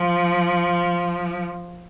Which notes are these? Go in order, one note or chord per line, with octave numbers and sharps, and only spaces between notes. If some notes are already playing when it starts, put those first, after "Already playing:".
Already playing: F3